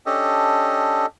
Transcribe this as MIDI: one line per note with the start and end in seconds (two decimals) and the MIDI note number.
0.06 1.06 61
0.06 1.06 62
0.06 1.06 67
0.06 1.06 69
0.06 1.06 75